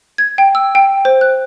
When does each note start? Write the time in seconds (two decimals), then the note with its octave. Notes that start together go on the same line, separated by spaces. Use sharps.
0.18 G#6
0.38 G5
0.55 E6
0.75 G5
1.05 C5
1.21 F#6